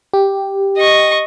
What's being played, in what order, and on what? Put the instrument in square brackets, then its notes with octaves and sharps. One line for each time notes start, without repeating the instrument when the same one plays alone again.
[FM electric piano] G4
[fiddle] D#5 C#6